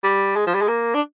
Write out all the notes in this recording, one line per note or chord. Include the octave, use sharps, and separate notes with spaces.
G3
G#3
F3
G3
G#3
A#3
D4